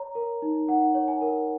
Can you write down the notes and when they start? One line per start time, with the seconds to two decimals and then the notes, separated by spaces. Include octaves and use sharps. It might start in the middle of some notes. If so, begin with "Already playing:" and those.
Already playing: C#5 A#5
0.15 A#4
0.42 D#4
0.68 D#4 F#5
0.95 C#5
1.08 G#5
1.21 A#4